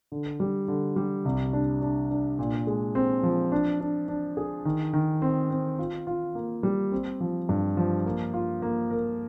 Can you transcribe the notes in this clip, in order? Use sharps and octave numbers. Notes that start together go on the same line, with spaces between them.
D3
G3
D3
G3
C2
D4
D4
D4
A#2
G#3
C4
F3
D4
D4
D4
G#4
D#3
D#3
C4
C4
F4
F4
A#3
G3
C4
F3
G2
F3
A#3
F4
A#3
A#4